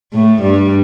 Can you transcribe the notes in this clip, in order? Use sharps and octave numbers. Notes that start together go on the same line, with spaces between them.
A2 A3
G2 G3